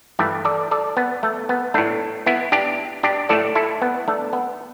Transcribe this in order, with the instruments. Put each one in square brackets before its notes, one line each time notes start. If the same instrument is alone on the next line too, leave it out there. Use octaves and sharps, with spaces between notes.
[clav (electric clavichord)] G2 E3 A3 G4 B4
A4 D5
A4 D5
B3
A3
B3
A2 A3 D4
B3 E4
D4 G4
D4 G4
A2 A3 A4 D5
E4 A4
B3
A3 D4
B3